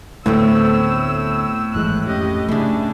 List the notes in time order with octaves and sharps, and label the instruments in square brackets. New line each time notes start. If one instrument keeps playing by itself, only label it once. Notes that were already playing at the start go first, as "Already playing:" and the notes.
[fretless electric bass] D2 [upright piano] A2 [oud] A3 B3 C4 [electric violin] E6
[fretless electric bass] G#1 E3 G#3 [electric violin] F#6
[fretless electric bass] F2 C#4 [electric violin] G4 D#5
[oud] G2 E4 [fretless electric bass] C#3 A3 [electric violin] D4 G#4